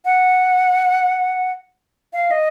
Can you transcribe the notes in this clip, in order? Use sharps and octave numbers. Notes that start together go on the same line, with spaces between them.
F#5
F5
D#5